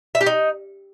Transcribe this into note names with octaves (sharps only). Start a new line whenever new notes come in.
E5
G4
D#4